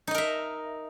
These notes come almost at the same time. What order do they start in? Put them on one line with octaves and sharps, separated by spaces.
D#4 D#5 A#4 E5